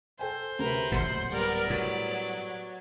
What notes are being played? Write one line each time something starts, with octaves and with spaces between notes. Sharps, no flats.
A4 C5 G5 G#5
D2 C3 A#4 B4
D1 G#1 A#2 F#5 C6
G3 B3 A#4 D5
A2 F#3